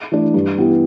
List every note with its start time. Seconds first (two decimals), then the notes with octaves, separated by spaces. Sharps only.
0.12 E3 A3 D4
0.34 G2
0.57 E3 B3 E4 G4